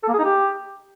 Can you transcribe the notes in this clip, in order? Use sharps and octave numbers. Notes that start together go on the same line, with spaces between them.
A4
A#3
G#4
D#4
G4